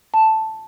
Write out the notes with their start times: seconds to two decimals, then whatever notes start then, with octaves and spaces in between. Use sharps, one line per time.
0.14 A5